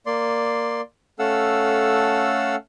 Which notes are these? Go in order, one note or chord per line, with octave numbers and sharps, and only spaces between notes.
A#3 D5 C6
A3 C#4 A4 F5 F#5 E6